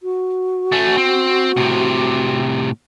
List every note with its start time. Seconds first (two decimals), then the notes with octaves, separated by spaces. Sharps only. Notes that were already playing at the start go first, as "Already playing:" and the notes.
0.03 F#4
0.72 A3 C#4
0.98 C4
1.57 A2 C3